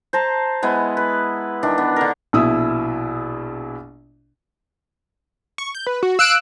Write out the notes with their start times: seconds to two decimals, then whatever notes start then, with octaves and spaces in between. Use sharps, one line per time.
0.13 C5 A5 A#5 C6
0.62 G#3 B3 E4
0.97 B4
1.63 D#3 E3 D4
1.78 B3
1.96 D3 A#4
2.33 A#1 B2 E4 D#6 E6
5.58 C#6
5.75 G6
5.87 B4
6.03 F#4
6.19 F5 E6 F#6 D7